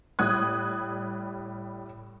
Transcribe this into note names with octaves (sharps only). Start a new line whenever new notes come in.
A2 G3 D#6 F#6 G#6